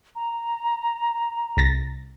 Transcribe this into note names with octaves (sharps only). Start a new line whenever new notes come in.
A#5
C2 A6 A#6